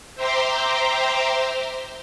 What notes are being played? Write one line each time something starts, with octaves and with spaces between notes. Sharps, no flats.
C5 E5 G5 A#5 C6 D6